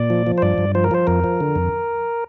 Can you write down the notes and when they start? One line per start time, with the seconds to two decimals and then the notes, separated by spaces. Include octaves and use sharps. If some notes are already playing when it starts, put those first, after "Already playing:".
Already playing: A#2 D5
0.10 F3
0.27 F3
0.38 C5
0.42 G2 D5
0.58 G2
0.75 F3 C5
0.84 A#4
0.91 F3 C5
1.07 F2 A#4
1.24 F3
1.41 D3
1.56 F2